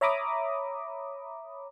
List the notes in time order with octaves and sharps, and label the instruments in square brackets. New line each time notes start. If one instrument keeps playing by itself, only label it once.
[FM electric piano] C#5 E5 A#5 B5 D6 D#6